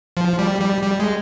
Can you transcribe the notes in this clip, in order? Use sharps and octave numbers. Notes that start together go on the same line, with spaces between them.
F3
G3
G3
G3
G#3